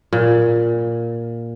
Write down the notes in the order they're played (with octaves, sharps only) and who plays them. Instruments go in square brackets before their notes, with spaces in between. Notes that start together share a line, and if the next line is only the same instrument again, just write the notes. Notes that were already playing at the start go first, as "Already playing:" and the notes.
[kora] A#2